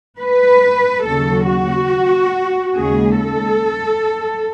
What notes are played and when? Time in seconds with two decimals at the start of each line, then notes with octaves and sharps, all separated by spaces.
0.19 B4
1.04 D#2 C#3 F#3 A4
1.47 F#4
2.75 D#2 C#3 G#3 G#4
3.18 A4